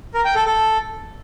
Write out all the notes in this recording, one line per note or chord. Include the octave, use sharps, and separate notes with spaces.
A#4
G5
A4
A4